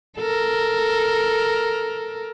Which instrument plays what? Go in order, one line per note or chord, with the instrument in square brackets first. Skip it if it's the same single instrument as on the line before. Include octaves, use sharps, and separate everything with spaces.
[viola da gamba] A4 A#4